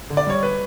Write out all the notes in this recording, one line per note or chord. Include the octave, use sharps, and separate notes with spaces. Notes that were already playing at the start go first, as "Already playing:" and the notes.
D3
D5
G3 C#5
B4